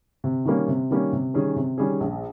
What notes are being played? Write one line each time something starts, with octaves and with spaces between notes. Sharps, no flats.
C3
D#3 G3 A#3 C#4
C3
D#3 G3 A#3 C#4
C3
D#3 G3 C#4 G#4
C3
D#3 G3 C#4 G#4
A#1